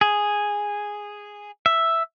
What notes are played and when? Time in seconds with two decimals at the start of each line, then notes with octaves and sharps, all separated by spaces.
0.01 G#4
1.66 E5